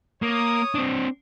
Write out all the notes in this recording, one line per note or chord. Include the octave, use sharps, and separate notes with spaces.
A#3 C#5 D#6
C4 D4